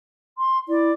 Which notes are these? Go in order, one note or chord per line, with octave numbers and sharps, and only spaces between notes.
C6
E4 D5